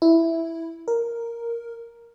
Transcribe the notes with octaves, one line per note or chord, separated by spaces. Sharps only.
E4
A#4